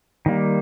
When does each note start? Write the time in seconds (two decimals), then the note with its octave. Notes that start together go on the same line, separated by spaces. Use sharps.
0.26 D#3 G3 A#3